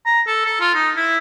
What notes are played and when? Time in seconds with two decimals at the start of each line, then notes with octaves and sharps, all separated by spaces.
0.06 A#5
0.27 A4
0.46 A4
0.60 F4
0.74 D#4
0.97 E4